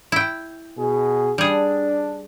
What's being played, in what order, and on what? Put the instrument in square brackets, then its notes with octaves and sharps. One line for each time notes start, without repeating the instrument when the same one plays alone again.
[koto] E4 G5
[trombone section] B2 G#4
[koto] G3 G#4 [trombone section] D4